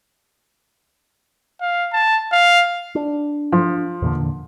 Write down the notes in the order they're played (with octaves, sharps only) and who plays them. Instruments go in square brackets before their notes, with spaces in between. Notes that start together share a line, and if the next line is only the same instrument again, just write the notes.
[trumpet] F5
A5
F5
[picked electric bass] D4
[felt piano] F3
[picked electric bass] E2 A#2 D3